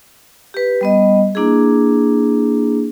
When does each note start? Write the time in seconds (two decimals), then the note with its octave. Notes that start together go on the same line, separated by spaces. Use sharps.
0.54 G4 B4
0.81 G3 B3 D#5
1.35 A#3 D4 E4 G#4